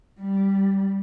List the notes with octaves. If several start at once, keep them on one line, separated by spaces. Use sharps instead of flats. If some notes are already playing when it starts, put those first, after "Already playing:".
G3